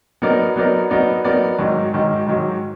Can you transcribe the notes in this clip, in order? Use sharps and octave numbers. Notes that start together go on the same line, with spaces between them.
F#3 B3 D#4 A#4 D5
F#3 B3 D#4 A#4 D5
F#3 B3 D#4 A#4 D5
F#3 B3 D#4 A#4 D5
G#2 D#3 F#3
G#2 D#3 F#3
G#2 D#3 F#3